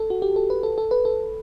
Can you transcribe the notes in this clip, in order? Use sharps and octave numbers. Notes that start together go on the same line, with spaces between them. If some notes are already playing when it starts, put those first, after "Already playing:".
Already playing: A4
F#4
G4
A4
B4
A4
A4
B4
A4